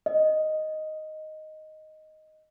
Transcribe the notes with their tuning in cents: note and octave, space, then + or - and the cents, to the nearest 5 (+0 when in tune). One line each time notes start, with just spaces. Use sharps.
D#5 +0